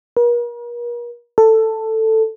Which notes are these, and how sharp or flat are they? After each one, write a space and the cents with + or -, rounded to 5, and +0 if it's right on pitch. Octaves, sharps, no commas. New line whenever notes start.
A#4 +40
A4 +10